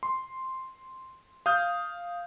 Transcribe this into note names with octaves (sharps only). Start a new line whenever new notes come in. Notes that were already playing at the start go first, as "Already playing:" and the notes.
C6
F5 D#6 F6 G6